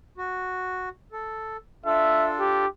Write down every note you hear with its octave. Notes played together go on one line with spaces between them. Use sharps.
F#4
A4
D4 F4 A4 E5
G4